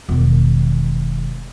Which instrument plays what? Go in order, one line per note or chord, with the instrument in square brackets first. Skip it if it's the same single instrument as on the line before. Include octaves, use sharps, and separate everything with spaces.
[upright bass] E1 D#3